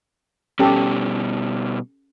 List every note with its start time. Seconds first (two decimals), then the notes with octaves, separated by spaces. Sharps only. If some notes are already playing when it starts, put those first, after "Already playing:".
0.59 B2 G3 C#4 G4 A4